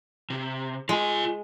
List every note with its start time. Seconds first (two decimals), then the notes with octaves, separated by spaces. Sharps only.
0.30 C3
0.89 G#3 F4 G#5